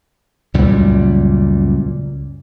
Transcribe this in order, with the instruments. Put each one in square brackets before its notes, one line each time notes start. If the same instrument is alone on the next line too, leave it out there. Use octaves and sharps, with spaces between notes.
[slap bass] C#2 F#2 A#2 G3